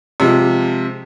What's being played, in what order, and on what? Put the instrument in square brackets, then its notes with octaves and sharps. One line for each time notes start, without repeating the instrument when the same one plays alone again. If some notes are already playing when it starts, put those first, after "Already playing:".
[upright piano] C3 F3 G#3